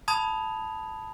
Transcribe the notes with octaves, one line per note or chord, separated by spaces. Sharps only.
A5 B5 D#6 G#6 F7